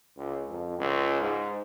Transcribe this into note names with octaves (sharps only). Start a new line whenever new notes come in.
C#2
F2
C#2
G#2